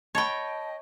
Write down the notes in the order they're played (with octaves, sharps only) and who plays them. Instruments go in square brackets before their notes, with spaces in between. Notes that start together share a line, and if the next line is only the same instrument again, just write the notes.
[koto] C#5 G5 [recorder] D#5 [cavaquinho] A5 B5